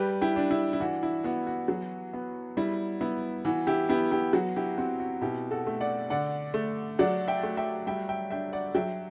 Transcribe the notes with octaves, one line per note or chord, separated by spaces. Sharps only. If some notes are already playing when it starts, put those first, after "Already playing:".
Already playing: G3 G4 B4
E4 G4
D4
E4
E4
E3 F#4
E4
B3 F#4
F#4
F#3
B3
G3 E4
B3 E4
E3 F#4
E4 G4
B3 E4 G4
E4 G4
F#3 F#4
E4 G4
C4 F#4
F#4
B2 E4 G4
F#4 A4
A3
D5 F#5
D3 D5 F#5
A3
F#3 D5 F#5
E5 G5
A3
E5 G5
G3 E5 G5
E5 G5
D4 E5 G5
D5 F#5
F#3 E5 G5